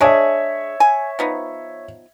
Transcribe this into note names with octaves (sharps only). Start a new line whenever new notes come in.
G#3 D4 G#4 C#5 E5
G#5
F3 B3 D#4